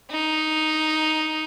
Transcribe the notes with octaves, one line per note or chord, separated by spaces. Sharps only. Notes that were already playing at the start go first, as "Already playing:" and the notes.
D#4